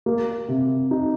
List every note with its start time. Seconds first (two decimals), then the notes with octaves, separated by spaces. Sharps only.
0.06 A#3
0.49 C3
0.91 D#4